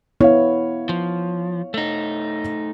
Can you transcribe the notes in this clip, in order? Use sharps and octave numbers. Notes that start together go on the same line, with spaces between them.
B3 E4 C#5 F5
F3
A3 D#4